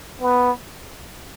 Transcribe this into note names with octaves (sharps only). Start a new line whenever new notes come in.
B3